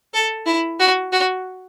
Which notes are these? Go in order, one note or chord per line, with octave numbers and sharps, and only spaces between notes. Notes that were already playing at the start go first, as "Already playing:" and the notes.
A4
E4
F#4
F#4